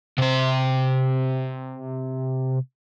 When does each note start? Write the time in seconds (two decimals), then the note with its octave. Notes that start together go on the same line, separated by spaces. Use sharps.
0.18 C3 C5